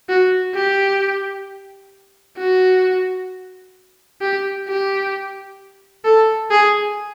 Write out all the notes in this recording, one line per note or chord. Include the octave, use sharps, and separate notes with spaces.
F#4
G4
F#4
G4
G4
A4
G#4